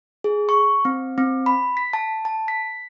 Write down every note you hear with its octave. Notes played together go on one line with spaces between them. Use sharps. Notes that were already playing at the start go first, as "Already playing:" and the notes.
G#4
C#6
C4
C4
B5
B6
A5
A5
B6